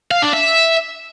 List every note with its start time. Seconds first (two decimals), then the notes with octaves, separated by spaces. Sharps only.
0.11 F5
0.22 D4
0.33 E5